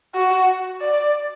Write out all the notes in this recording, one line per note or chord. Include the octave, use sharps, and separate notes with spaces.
F#4
D5